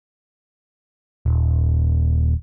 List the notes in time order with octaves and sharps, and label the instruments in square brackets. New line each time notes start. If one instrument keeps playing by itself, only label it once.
[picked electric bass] D#1